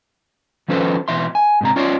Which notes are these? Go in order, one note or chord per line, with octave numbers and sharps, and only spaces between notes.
D#3 F3 C#4 A4 B4 C5
B2 E3 E5 C6
G#5
G#2 C3 A#5
C#4 F4 C#5 D5 E5 C6